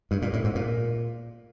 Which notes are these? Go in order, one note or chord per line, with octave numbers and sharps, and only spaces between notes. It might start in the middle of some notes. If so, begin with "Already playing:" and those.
G2
A#2
A2
G#2
A#2